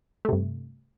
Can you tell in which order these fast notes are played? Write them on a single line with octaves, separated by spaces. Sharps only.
A3 C3 G2